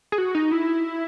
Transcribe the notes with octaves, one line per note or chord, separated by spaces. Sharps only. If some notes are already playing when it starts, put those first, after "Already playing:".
G#4
F#4
D#4
E4